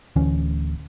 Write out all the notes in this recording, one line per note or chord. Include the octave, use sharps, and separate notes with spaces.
D1 D2 E3 C#4